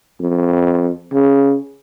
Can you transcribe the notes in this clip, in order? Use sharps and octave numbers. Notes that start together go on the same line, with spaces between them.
F2
C#3